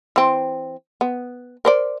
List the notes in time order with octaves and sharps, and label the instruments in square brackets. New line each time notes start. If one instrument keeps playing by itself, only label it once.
[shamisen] E3 C4
B3
A#4 C5 D5